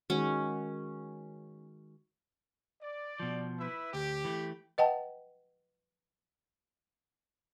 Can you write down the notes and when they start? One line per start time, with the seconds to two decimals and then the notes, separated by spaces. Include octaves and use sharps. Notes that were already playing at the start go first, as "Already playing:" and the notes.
0.10 D#3 G#3 C#4 F#4
2.82 D5
3.20 B2 F3
3.59 E4 B4 E5
3.94 D2 G4
4.24 E3 A3
4.78 B4 D#5 F#5 G5 A5